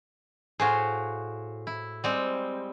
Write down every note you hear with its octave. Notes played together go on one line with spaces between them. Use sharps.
A2 F#4 G#4 C5 F5
E4
G3 G#3 C4